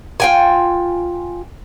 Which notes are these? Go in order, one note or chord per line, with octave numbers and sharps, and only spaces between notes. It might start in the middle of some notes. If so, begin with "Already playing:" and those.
F4 G5 G#5